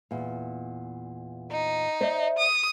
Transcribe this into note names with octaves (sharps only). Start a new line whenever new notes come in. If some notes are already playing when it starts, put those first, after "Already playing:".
E2 A#2
D#4
C5 D5 E5
D#6